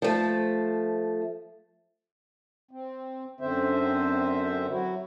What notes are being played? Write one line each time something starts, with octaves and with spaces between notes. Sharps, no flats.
F3 A3
C4
F#2 D3 C4 C5 E5
F#3 E4 F#4